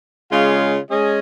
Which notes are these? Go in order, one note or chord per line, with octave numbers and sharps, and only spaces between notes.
C#3 G#3 F4 C#5 F5
G#3 C#4 G#4 D#5